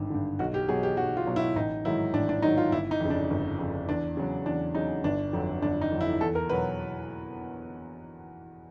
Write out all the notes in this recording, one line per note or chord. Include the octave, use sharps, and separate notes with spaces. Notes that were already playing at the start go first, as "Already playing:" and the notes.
Already playing: G#1 G2 D3
G2 D3
B1 F#4
G4
B2 F#3 G#4
G4
B1 F#4
F4
B2 F#3
E4
A1 D#4
G#2 D#3 F#3 E4
A1 D4
D4
G#2 D#3 F#3 D#4
F4
G1 E4
D#4
F2 C#3
D4
G1
F2 C#3
E2 D4
C#3 F#3
E2 D4
C#3 F#3 D#4
G1 D4
F2 D3 F#3
G1 D4
D#4
F2 D3 F#3
E4
E2 A4
A#4
B2 F#3 B4